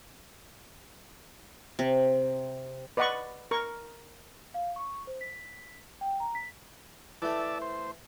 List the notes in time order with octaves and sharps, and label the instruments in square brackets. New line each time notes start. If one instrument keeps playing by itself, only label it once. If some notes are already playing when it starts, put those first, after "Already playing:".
[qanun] C3
[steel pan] B4 D5 D#5 F#5 B5 C#6
A#4 C#6
[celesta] F5
C#6
C5
B6
G5
A#5
B6
[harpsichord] E3 A3 [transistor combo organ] D5 E5 A5
[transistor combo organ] C5